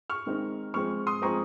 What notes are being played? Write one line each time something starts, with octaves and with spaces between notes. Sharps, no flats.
C#6 F6
D#3 G#3 C4 D#4
F3 G#3 C4 C#6 F6
C6 D#6
F3 G#3 C4 A#5 C#6